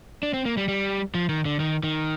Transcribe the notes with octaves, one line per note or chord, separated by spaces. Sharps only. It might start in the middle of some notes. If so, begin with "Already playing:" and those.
D4
C4
A#3
G3
G3
F3
D#3
D3
D#3
D#3